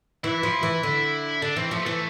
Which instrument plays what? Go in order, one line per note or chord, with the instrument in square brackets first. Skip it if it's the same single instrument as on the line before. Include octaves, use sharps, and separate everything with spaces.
[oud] E3 [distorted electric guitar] E4
[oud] F3
E3
D3
[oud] D3 [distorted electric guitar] D4
[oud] E3 [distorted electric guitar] C4
[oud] F3 [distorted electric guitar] A3
[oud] E3 [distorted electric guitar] A3